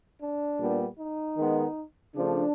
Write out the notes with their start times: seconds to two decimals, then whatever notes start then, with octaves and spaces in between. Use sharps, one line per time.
0.22 D4
0.60 A#2 G3 B3
0.99 D#4
1.37 D#3 G#3 B3
2.16 C#3 F3 A3 D4